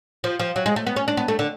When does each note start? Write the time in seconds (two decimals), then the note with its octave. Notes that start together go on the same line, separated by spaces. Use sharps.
0.24 F3
0.40 F3
0.56 F#3
0.66 G#3
0.76 A3
0.87 B3
0.96 C#4
1.08 D4
1.17 B3
1.28 A3
1.39 D3